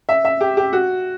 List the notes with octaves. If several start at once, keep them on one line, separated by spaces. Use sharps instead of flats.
E5
E5
G4
G4
F#4